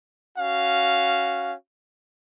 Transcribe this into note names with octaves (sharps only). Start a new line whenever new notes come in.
C#4 F#4 F5